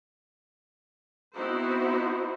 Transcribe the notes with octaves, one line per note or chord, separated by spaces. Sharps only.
B3 C4 D#4 E4 F#4 C5